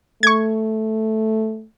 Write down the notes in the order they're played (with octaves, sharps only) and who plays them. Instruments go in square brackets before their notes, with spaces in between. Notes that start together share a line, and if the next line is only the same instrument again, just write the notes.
[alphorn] A3 [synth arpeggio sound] C#6 G#6